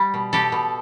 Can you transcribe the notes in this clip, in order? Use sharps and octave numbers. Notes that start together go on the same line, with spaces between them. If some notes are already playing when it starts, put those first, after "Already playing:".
Already playing: G3
B2
B2 G4 A4
B2